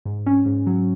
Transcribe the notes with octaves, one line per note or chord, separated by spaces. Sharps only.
G#2
C#4
G#2
F#3